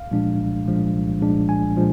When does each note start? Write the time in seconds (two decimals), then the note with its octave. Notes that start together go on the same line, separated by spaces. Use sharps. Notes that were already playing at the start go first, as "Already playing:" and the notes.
Already playing: C2 F5
0.11 A#2 F3 G#3 D4
0.39 C2
0.67 A#2 F3 G#3 D4
0.93 C2
1.21 A#2 F3 G#3 D4
1.49 C2 G#5
1.77 A#2 F3 G#3 D4